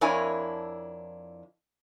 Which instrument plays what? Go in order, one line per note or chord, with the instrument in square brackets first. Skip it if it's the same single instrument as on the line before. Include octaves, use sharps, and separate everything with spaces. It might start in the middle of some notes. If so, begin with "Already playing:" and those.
[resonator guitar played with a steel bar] F2 D4 E4 A#4 C#5 G#5